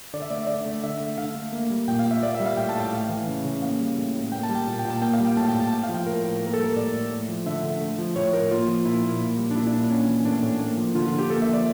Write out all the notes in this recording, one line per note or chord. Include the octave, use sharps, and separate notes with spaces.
D3 D5
E5
A3 D5
E5
D3 D5
A3
D3 E5
A3
D3 F5
A3
A#3
G3
A#2 G5
F5
A#2
E5
A#3 D5
E5
G3
F5
A2 G5
A5
A2
G5
A3 F5
E3
C#3
C#3
A#3 F5
G3
A2
A2
A#3 G5
A5
G3
G5
A#2
G5
A#2
A5
A#3 G5
F5
G3
G5
A2 A5
G5
A2
A5
A3 G5
F5
F3
G5
A2 A#4
A2
A#3
A#4
A4
G3
A#4
A2 D5
A2
A3
F3
D3 E5
D3
A3
F3
A2 C#5
A2 A#4
A#3 F4
F3
A#2 E4
A#2
A#3
G3
D4
A#2 E4
D4
A#2
D4
A#3 C#4
E3
A2 D4
A2
A#3
F3
D3 F4
F4
D3
G4
A#3 A4
E5
F3
D5